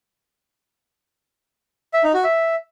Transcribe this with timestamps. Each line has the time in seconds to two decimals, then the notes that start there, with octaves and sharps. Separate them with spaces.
1.94 E5
2.04 D#4
2.14 F#4
2.24 E5